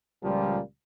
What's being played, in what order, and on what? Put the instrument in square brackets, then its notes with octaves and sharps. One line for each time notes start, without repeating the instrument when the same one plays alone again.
[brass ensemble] C#2 A#2 F3 G3